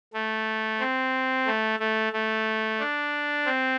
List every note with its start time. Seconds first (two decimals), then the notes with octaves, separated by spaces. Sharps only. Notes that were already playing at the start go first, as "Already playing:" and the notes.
0.14 A3
0.80 C4
1.46 A3
1.80 A3
2.13 A3
2.79 D4
3.46 C4